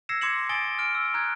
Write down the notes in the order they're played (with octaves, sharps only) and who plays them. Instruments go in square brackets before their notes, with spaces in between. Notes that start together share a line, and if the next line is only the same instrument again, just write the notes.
[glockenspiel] E6 G#6 A#6 C7 C#7 E7
C6 D6 G#6 C#7 E7 F#7
G#5 D#6 A6 D7 G7
F6 D7
E6
A#5 F6 F#6 G#6